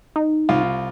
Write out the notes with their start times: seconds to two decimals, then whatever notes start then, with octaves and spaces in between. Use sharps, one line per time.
0.16 D#4
0.49 C2 F4